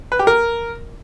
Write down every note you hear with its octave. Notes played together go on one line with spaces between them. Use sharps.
B4
G4
A#4